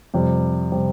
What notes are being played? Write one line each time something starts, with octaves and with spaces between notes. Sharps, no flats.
F2 C3 G3
C3 G3